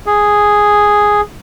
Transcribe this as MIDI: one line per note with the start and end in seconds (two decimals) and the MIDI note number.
0.06 1.21 68